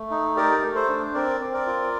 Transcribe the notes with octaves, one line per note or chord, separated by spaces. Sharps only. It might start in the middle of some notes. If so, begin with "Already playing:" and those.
Already playing: A3
D#4
G4 A#4 D5
A3
A4 C5
D4
C4 A#4 D5
C4
A#4 D5
F4